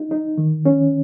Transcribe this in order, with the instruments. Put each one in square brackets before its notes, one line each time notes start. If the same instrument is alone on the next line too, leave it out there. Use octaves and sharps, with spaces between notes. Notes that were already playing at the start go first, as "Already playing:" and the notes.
Already playing: [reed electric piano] D#4
D#4
D#3
C#4